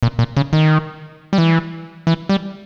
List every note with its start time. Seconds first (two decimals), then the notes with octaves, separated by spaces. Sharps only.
0.03 A#2
0.19 A#2
0.37 C#3
0.53 D#3
1.33 G3
1.38 E3
2.07 E3
2.29 G3